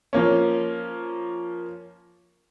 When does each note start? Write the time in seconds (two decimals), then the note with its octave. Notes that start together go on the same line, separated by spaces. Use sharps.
0.13 F3 A#3 C#4